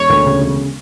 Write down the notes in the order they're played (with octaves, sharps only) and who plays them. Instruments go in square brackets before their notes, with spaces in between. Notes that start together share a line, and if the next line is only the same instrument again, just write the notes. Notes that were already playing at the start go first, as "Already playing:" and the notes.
Already playing: [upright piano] E1 [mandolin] C#5
[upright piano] D2
C#3
E1